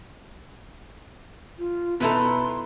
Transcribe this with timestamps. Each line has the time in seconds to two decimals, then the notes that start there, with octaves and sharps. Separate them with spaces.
1.59 F4
2.00 B2 D#4 E4 A4 B4 C6